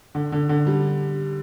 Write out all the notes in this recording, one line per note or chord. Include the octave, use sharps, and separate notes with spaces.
D3
D3
D3
G3